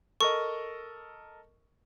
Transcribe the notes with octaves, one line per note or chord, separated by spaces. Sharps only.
A4 A#4 D#5 C#6